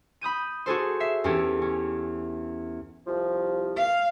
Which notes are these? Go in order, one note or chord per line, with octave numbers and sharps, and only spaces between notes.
B5 D#6 G6 D#7
F#4 G#4 A4 C5
E5 C7
E2 C#4 G4 A4
C#4
C2 F3
F5